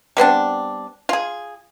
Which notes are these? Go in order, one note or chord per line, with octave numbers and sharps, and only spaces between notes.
G3 B3 C4 D4
F4 G#4